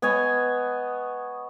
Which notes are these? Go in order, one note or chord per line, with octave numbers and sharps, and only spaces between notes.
B3 C#5 D#5 G#5